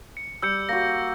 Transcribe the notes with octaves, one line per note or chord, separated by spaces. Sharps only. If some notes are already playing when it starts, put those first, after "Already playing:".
C#7
G3 E6 G6 C#7
A#3 F#4 A#6